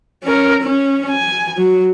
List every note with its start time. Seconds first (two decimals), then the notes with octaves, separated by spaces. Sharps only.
0.23 C#4 A#4
0.61 C#4
1.09 G#5
1.57 F#3